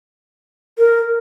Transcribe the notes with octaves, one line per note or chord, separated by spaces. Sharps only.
A#4